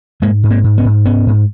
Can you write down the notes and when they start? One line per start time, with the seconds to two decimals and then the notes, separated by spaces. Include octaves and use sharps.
0.22 G#2 G#3 A#3
0.43 G#2
0.50 A#3 C4
0.64 G#2
0.78 B3 C#4
0.85 G#2
1.05 G#2 B3 C#4
1.27 G#2